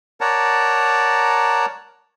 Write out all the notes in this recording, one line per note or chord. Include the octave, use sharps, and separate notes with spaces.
A#4 C#5 D5 F#5 A5 A#5